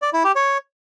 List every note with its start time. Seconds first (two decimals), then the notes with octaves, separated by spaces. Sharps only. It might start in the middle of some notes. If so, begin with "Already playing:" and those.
0.02 D5
0.13 E4
0.24 G4
0.36 C#5